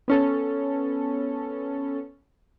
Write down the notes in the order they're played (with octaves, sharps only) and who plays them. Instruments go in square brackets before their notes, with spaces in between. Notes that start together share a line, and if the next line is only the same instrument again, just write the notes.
[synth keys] B3 C#4 A4